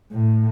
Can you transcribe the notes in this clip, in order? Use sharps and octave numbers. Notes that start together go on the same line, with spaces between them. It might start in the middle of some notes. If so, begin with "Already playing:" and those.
A2